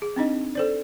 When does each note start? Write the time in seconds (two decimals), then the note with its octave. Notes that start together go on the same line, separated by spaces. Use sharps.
0.02 G#4
0.16 C4 D4 D#4 D#5
0.55 A4 C5 D5